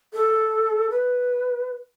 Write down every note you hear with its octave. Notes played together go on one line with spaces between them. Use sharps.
A4
B4